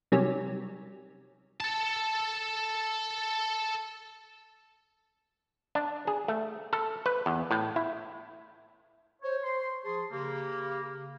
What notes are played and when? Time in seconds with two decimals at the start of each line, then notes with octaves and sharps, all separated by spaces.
0.12 C3 D#3 F#3 G3 C#4
1.60 A4 A5
5.75 D4
6.07 G#4
6.28 A3
6.73 A4
7.06 B4
7.26 E2
7.51 A2
7.76 E4
9.23 C5 C#5
9.44 C5 C6
9.83 F3 G#4 A5 C6
10.11 C#3 A#3 G4